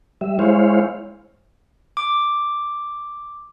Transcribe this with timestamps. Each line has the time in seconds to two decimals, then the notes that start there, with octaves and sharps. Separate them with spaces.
0.21 G3 E5
0.39 G#3 E4 C5 C#5 F5
1.97 D6